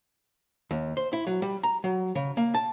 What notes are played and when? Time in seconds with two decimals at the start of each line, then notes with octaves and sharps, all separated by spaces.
0.71 D#2
0.97 C5
1.13 E4
1.27 F#3
1.42 G3
1.63 A#5
1.84 F#3
2.15 C#3
2.37 A#3
2.55 A5